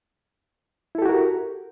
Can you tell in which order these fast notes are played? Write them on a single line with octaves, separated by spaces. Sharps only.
E4 A4 G4 F#4 A#4